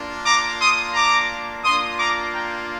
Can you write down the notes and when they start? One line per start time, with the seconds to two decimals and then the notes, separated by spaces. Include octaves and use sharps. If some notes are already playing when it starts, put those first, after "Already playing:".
Already playing: A#3 D4 F4
0.25 A#5 D6
0.59 C6 D#6
0.94 A#5 D6
1.64 A#3 D4 F4 C6 D#6
1.99 A#5 D6
2.34 G5 A#5